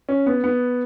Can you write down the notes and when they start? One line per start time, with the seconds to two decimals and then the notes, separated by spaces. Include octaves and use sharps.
0.09 C#4
0.26 B3
0.44 B3